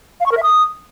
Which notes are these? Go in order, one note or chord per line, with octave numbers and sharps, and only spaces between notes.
F5
C#6
A#4
E5
D#6